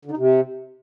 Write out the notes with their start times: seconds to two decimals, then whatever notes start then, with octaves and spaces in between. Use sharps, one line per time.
0.05 D3
0.11 D#4
0.17 C3